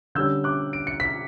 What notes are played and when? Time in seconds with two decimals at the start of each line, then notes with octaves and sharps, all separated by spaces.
0.15 D3 G3 C#4 E6 G6
0.44 D6 F#6
0.73 D7
0.87 C#7
1.00 B6